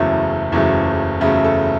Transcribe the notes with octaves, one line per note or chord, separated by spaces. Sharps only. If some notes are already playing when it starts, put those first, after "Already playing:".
Already playing: F#1 E2 C#3 F#3 A3 E4
F#1 E2 C#3 F#3 A3
F#1 E2 C#3 F#3 A3 E4
A4